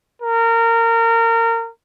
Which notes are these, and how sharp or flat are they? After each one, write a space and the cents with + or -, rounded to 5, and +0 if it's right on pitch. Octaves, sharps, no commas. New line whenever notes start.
A#4 -25